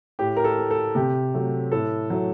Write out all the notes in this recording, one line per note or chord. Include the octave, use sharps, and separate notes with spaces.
A2 G4
A#4
A4
A3
A4
C3 G4
F#3 A3
A2 A4
F#3 A3